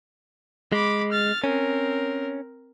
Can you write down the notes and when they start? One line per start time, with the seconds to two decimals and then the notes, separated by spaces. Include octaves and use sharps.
0.72 G#3 B5 D6
1.12 F6 A6
1.44 C4 C#4 A#4